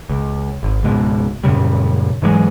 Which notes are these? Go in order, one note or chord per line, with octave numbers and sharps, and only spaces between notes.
C#2
G#1
C#2 G#2 B2
F#2 A#2 C#3 G3
G#2 E3 F#3 G#3